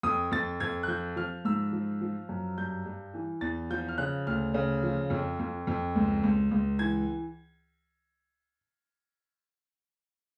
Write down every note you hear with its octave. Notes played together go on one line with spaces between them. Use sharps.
F2 D#6
F2 A6
F2 G#6
F#6
F3 G6
F3 F6
G#2 E6
F3
F3
F#2
G2 G6
G2
E3
E2 A6
F3 G6
F6
C#3 F#6
D2 F6
C#3
F3
F2
F2
F2
C#2
C#2
C#2
E3 G#6